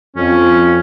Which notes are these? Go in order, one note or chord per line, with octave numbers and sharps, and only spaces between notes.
F2 C#4